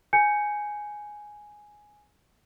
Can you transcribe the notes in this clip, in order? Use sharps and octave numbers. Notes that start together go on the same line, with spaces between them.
G#5 G6 C#7